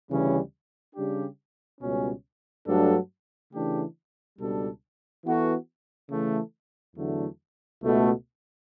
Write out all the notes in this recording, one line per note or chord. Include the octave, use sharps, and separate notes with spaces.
D2 C#3 E3 G3 C#4
C#3 G3 D4 G4
C#2 B2 G3 C#4
G2 F#3 A3 D4 A4
C#3 E3 A3 D4 G4
C#2 B2 G3 D4 A4
E3 B3 F#4 A4
C#3 E3 A3
E2 D3 F#3 A3
C#2 B2 A3